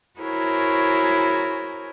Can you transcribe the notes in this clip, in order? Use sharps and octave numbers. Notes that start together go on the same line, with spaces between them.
E4 F#4 G#4 A#4 C5 C#5